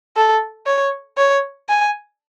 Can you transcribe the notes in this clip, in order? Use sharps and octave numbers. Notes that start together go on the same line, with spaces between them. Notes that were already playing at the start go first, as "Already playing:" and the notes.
A4
C#5
C#5
G#5